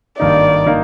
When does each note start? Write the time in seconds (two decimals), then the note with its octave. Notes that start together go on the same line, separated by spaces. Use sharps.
0.19 G#1 G2 D#3 A#3 D#4 D5
0.66 D#3 A#3 D#4